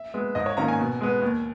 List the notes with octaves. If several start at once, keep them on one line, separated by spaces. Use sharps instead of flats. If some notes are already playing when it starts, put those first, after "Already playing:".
Already playing: E5
G#3 B3
G#2 D#5
C#5
D#3 A#3 C#4 A#5
G#5
B2
G#3 B3
D#2